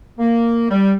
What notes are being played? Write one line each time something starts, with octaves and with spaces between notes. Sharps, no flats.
A#3
G3